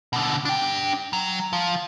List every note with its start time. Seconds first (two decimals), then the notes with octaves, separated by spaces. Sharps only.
0.13 B2 D3
0.45 D4 G5
1.13 F#3
1.53 F3